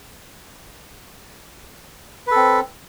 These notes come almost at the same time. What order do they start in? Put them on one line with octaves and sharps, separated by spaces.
B4 A4 C4